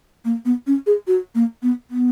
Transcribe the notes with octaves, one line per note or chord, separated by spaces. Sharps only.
A#3
B3
C#4
G#4
F#4
A#3
B3
B3